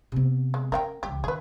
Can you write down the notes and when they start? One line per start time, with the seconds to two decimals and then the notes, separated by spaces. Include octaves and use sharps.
0.12 C3 B3
0.54 G#3
0.72 C#4 A#4 F5 G5
1.03 C#2 E3 G4
1.24 D#3 G#4 B4